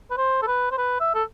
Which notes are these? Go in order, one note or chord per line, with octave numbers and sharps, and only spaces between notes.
B4
C5
A4
B4
C5
B4
E5
A4